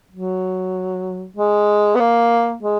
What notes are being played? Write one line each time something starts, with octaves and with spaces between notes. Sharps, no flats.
F#3
G#3
B3
A#3
G#3